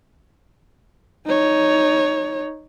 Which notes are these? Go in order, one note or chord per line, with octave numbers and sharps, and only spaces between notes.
D#4 C#5